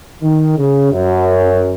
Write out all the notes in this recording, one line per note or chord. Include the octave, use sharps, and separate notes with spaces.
D#3
C#3
F#2